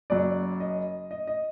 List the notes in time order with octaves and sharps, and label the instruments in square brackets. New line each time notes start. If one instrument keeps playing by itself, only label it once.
[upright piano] F#1 F#2 F#3 D5
D#5
D#5
D#5